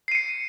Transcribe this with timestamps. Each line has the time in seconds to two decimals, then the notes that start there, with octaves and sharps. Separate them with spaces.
0.08 C7
0.12 D#7
0.15 C#7